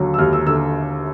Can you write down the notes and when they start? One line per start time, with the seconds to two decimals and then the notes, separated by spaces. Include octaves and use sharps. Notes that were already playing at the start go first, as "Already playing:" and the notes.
Already playing: D#2 D3 F#3
0.14 E6
0.18 D#2 F6
0.33 E6
0.46 D3 E6